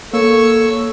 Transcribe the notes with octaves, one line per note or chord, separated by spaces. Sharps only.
A#3 A4 C#5 C#6 E6